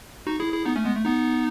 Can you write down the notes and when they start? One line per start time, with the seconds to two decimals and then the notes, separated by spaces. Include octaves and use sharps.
0.27 D#4 F#4
0.40 E4 G#4
0.53 E4 G#4
0.65 B3 D#4
0.76 A3 C#4
0.85 G#3 B3
0.95 A3
1.05 B3 D#4